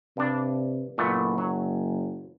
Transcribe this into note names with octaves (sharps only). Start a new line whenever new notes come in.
G2 C3 D4
F#1 A#2 A3 B3
F#3